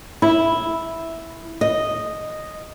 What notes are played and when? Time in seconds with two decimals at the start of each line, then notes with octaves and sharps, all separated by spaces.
0.22 E4
1.61 D#5